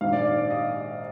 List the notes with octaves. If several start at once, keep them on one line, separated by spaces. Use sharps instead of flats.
A#1 G#2 D#3 F5
D5
D5
D5
D#5